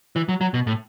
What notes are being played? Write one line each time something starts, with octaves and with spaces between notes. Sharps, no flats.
E3
F#3
F#3
B2
A2